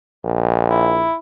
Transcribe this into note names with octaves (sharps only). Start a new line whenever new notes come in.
A#1
E4